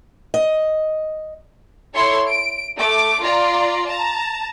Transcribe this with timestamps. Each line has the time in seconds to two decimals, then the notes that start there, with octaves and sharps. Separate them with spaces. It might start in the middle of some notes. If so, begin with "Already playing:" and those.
0.34 D#5
1.95 E4 A4 C#5 C6
2.27 D7
2.77 A3 D6
3.21 F4 D5 A#5
3.88 A5 A#5